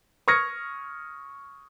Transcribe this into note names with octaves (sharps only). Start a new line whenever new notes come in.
C#6 D#6 F6 G#6 A#6 C#7